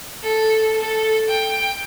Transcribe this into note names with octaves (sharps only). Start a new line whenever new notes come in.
A4
A4
G5